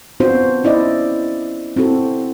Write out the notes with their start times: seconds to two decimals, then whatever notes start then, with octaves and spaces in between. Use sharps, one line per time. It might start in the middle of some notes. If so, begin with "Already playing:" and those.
0.20 B3 C4 D4 F4 F#4 C5
0.64 C#4 E4 D5 D#5
1.76 C4 E4 F#4 A4